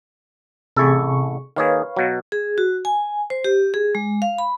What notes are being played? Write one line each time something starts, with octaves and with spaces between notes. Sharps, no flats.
A1 C3 E4 G#4 A4 C#6
D#3 A#3 G#4 B4 C#5 F5
B2 F#3
G#4
F#4
G#5
C5
G4
G#4
G#3
F5
B5